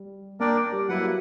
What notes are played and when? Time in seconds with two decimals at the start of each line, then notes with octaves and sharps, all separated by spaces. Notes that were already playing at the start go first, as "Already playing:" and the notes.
Already playing: G3
0.40 A#3 D4 A#4 D5 G5
0.72 G3
0.89 F#3 A#3 E4 B4 F#5